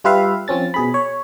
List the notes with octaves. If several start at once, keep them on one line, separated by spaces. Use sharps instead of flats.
G3 F4 G4 B4 E5 F5
F3 C4 C#4 A6
B2 G#4 B5
C#5